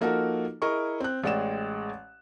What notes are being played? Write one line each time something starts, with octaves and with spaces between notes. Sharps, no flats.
F3 A#3 D#4 F#4 A4 A#4
E4 G#4 A#4 D#5 C#6
C4 F#6
A1 G#3 D5 G5 E7